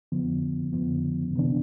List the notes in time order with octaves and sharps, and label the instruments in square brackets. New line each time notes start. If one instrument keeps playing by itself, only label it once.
[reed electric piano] F2 D3 F3 B3
F2 D3 F3 B3
C3 E3 B3 D4